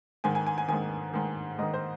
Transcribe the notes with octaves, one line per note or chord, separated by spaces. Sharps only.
G#2 D#3 G#5
G#5
G#5
G#5
G#2 D#3 G#5
G#2 D#3
G#2 D#3 D#5
C5